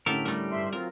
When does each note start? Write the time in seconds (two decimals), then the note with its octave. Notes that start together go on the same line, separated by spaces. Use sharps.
0.06 A2 D3 C#4 G4 A4 A#4 E5
0.25 G3 A3 A#4
0.52 G2 E5 C6
0.72 F#3 C4 F4 A#4